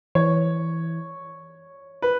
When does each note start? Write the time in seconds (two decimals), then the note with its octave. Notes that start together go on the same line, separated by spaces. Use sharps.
0.15 E3 C#5
2.02 B4